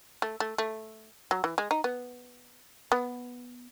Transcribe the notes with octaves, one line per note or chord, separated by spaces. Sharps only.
A3
A3
A3
F#3
E3
G#3
D#4
B3
B3